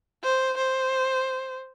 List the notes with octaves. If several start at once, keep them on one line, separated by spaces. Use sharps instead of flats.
C5
C5